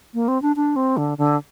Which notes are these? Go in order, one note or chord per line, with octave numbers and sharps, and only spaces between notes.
A#3
C4
D4
D4
C4
D3
D3